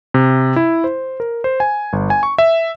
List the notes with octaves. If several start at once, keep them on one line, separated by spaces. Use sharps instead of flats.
C3
E4
C5
A#4
C5
G#5
G1
G#5
C#6
E5